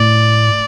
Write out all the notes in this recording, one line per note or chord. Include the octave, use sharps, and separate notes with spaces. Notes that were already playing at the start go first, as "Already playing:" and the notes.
Already playing: A2 D5